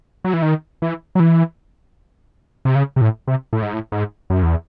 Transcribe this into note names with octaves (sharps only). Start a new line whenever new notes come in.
F#3
E3
D#3
E3
F#3
E3
C3
C#3
C3
A2
C3
A2
G#2
A2
G#2
F#2
E2